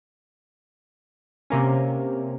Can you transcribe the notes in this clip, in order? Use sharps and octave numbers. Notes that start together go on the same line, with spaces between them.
C3 A#3 C#4